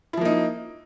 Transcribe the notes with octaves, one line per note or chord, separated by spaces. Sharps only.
F3 A#3 D#4 E4